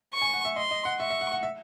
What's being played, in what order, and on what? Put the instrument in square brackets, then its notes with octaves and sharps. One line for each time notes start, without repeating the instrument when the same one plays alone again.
[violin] C#6
[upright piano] G#5
F#5
E5
[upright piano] D#5 [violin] C6
[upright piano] D#5
F#5
[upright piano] E5 [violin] C#6
[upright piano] E5
F#5
F#5
E5